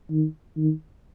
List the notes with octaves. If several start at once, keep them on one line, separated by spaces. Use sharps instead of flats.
D#3
D#3